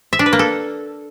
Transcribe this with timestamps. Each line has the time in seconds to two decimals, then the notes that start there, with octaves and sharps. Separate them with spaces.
0.13 E5
0.19 D4
0.26 B4
0.33 A#3
0.39 A4